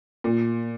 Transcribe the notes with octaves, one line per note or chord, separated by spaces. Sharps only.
A#2